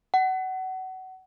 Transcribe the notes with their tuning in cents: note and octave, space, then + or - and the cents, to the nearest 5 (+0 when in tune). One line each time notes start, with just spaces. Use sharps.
F#5 +25